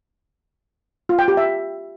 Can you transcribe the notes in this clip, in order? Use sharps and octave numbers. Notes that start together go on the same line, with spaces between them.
F4
G5
G4
E5